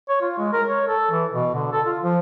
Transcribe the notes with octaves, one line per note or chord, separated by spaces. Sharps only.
C#5
F4
G#3
A#4
C#5
A4
E3
B2
D3
A4
F4
F3